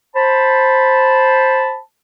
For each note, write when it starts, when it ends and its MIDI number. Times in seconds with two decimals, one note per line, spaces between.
0.16 1.79 72
0.16 1.79 81
0.16 1.79 83